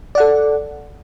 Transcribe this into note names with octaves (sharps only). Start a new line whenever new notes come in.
A4 D5 F#5